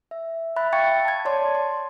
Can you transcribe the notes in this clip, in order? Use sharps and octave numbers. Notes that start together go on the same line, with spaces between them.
E5
E5 B5 F#6 A6
F5 G5 C#6 G#6 A6 C#7
A5 G#6
C#5 D5 A5 C6 D6
C6